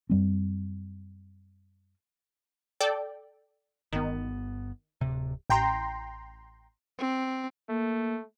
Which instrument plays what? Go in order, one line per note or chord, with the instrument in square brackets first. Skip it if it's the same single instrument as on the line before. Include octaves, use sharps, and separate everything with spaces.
[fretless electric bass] F#2 G3 C4
[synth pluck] A4 D5 G5
[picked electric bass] G1 B3 [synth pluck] D#3
[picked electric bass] D1 C3
[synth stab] A1 G5 A#5 C6
[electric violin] C4
[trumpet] A3 [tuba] A#3